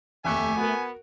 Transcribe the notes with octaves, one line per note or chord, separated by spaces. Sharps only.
F1 D#2 A3 G4 E5 G#5 C#6 F#6
B3 F#4 A#4